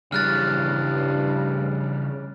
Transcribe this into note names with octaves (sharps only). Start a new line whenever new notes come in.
G2 C#3 G3 F6 F#6 A6